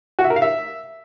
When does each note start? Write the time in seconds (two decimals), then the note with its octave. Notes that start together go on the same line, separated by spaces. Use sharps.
0.19 F#4
0.24 E5
0.30 A#4
0.36 F5
0.42 E5